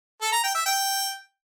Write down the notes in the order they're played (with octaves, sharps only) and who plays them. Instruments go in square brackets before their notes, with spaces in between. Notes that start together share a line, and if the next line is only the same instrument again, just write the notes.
[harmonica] A4
A#5
G5
E5
G5